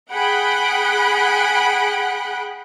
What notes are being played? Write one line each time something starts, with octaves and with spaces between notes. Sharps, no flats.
G#4 F#5 G5 B5 F#6 D7